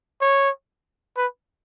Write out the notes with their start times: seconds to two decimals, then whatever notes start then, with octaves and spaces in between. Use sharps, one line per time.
0.21 C#5
1.17 B4